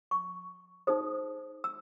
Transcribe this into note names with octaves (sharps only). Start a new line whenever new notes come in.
C#6
D#4 G#4 C5 D#6
E6